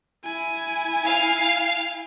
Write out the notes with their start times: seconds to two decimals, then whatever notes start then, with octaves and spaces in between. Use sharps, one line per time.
0.25 E4 G#5
1.07 F5